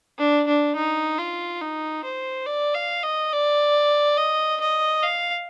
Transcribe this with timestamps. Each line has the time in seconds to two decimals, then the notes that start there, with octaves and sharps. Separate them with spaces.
0.18 D4
0.47 D4
0.76 D#4
1.18 F4
1.61 D#4
2.04 C5
2.46 D5
2.74 F5
3.03 D#5
3.32 D5
4.17 D#5
4.60 D#5
5.03 F5